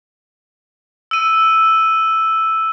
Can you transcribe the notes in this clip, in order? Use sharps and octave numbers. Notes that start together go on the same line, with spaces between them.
E6 D#7